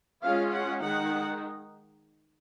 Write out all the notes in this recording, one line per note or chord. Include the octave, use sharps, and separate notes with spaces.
G#3 C#4 F4 F5
F#5
D#3 G#3 D#4 F#5